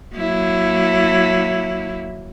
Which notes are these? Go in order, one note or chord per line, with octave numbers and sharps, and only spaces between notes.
F#3 A#3 E4